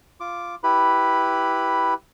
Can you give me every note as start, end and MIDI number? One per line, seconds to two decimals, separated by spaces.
0.20 0.55 65
0.20 0.55 86
0.63 1.94 64
0.63 1.94 67
0.63 1.94 71
0.63 1.94 83